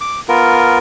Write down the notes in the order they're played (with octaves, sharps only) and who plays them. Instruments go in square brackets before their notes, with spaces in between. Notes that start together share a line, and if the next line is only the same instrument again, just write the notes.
[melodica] D6
B3 F4 A#4